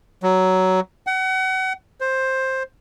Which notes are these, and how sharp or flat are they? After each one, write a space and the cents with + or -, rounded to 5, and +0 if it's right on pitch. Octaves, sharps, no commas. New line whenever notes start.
F#3 +15
F#5 +30
C5 +10